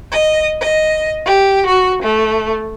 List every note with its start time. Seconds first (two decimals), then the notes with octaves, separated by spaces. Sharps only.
0.11 D#5
0.61 D#5
1.25 G4
1.65 F#4
2.02 A3